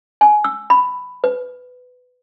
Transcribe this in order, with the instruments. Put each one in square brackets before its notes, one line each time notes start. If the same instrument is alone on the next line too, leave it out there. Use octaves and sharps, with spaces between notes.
[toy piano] G#5
E6
B5
B4